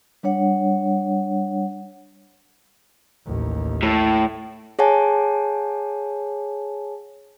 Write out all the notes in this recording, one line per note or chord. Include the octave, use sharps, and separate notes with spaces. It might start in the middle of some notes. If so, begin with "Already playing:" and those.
G3 D4 C#5 F#5
A1 D#2
A2
G#4 C#5 F#5 G#5 A5